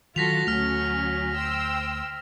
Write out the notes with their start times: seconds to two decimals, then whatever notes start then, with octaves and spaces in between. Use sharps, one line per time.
0.16 D#3 F#3 F4 F#4 A4 A#6 B6 F7
0.47 D2 F#3 A3 C#4 F6 F7
1.33 C5 G5 E6